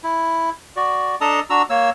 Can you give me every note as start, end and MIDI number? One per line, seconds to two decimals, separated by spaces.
0.03 0.50 64
0.77 1.15 66
0.77 1.15 74
1.21 1.40 62
1.21 1.40 69
1.21 1.40 75
1.21 1.40 81
1.21 1.40 82
1.21 1.40 87
1.50 1.62 62
1.50 1.62 66
1.50 1.62 82
1.50 1.62 88
1.70 1.90 58
1.70 1.90 73
1.70 1.90 88